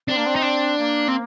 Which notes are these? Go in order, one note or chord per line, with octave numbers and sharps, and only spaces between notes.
C4 D4
A#3
C4
D#4
D4
A#3
C4